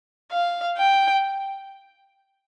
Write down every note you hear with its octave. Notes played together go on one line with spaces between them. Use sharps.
F5
G5